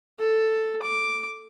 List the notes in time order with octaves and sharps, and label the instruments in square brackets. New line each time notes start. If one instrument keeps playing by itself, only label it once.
[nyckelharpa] A4
D6